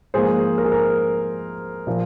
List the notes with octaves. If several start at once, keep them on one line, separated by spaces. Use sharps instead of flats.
G#2 F3 A#3 G#4 C5
A#4
G#4
A#4
A#2 F3 A#3